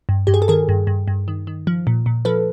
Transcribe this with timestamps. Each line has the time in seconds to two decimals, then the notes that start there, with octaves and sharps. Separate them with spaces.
0.09 G2
0.27 G2 G4
0.34 G#4
0.42 A4
0.48 D#3 G#4 A#4
0.69 G2
0.87 G2
1.08 G2
1.28 D#3
1.47 D#3
1.67 F3
1.87 A#2
2.06 A#2
2.25 F3 A4 B4